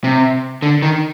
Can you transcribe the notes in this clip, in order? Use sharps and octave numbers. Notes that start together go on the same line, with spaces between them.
C3
D3
D#3